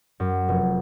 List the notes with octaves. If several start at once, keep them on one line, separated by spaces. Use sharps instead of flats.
F#2
F1